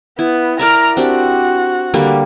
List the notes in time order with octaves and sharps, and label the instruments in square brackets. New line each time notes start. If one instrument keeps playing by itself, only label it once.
[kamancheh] B3 [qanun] E4
[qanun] A#4 D5 E5 [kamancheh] A#5 F6
[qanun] C4 D4 G4 [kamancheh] F#4
[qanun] D3 G3 A#3